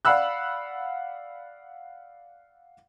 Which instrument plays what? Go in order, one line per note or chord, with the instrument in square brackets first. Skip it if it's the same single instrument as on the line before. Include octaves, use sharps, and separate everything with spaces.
[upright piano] D5 F5 F#5 B5 E6 F#6